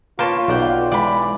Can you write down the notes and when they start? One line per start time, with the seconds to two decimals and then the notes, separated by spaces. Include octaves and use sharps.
0.19 A#3 F4 B4 C#5 G5 A5 C6
0.48 B1 D5 F#5 G5
0.92 E3 G#3 D5 B5